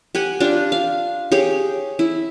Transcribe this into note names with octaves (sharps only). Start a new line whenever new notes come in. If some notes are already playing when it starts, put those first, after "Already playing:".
G4 F#5 G#5
D4 F4 G4
F5
G4 G#4 C#5
E4